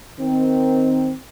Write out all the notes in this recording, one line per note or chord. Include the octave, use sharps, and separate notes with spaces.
D#3 C4